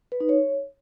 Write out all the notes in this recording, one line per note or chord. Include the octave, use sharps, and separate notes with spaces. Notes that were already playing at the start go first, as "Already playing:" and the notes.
B4
D#4
C#5